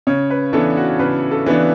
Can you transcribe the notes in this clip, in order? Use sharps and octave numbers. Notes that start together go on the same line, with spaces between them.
C#3 C#5
B4
E3 B3 D4 A4
F#4
C#3 B4
A4
E3 B3 D4